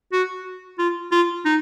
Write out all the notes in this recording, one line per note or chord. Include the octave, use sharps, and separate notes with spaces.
F#4
F4
F4
D#4